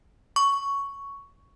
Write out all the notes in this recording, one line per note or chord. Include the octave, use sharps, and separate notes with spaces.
C#6